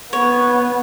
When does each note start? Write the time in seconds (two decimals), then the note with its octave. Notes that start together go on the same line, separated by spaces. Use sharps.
0.13 B3 C#5